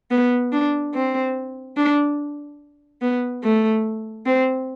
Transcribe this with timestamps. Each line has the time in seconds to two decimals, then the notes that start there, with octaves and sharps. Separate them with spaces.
0.11 B3
0.52 D4
0.94 C4
1.77 D4
3.02 B3
3.43 A3
4.26 C4